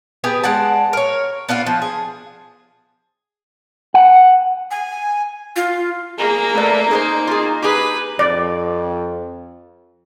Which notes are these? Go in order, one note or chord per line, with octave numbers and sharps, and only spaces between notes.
B3 G4 G#4 B4
G#3 D5 F#5 A5
A#4 C#5
B3 D4 F4 F5
F3
G#4
F#5
G#5
F4
A#3 G#4 A#4
A3 A#4 B4 D5
D#4 G#4 B4 C5
F4 G#4
G4 G#4 B4
F2 D5